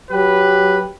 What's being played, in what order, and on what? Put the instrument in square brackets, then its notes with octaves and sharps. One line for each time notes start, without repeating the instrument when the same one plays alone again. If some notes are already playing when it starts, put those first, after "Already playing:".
[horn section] F#3 G4 B4